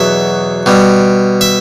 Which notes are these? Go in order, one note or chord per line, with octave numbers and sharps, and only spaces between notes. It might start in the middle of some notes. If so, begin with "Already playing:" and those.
Already playing: E2 B2 F#3 E5
B2 G3
E5